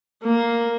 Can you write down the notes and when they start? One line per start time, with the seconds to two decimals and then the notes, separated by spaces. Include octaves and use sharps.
0.24 A#3